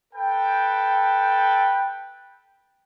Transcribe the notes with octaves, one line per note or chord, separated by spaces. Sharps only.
A4 B4 G5